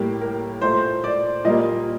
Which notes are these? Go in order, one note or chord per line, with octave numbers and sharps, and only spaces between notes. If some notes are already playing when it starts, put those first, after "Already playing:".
Already playing: A2 G3 A#3 G4
A#4
A#2 A3 C5
D5
A#2 G3 A#3 D#5